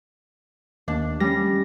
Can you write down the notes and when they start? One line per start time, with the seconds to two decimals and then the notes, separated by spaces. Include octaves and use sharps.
0.88 D#2 D4
1.20 G3 C#4 A#6